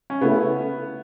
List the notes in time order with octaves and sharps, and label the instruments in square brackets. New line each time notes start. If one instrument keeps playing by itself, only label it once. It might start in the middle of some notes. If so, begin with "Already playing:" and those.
[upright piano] C#4
[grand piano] C#3 A3 E4 [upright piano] B3